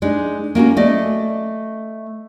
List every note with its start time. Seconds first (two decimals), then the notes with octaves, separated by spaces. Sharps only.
0.02 G#3 D4 D#4
0.55 A#3 C#4 F4 F#4
0.77 A3 D5 D#5